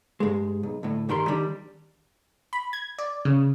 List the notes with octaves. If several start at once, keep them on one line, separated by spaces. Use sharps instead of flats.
G2 G#3
B1
D2 A2
G2 D#3 G3 A#4 C6
D#3 G3 D4
B5
G#6
D5
C#3